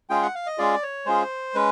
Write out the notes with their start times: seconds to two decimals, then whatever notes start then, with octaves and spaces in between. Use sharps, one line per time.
0.10 G#3 C#4 F4 G#4 G5
0.22 F#5
0.35 F5
0.46 D#5
0.58 G#3 C#4 F4 G#4 D5
0.83 C#5
1.06 G#3 C#4 F4 G#4 C5
1.54 G#3 C#4 B4